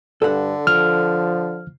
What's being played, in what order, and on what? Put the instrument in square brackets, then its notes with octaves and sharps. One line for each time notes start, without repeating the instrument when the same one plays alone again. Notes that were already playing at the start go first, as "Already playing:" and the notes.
[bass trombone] G2 [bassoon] D3 [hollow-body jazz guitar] A4 F#5
[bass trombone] F3 [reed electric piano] F6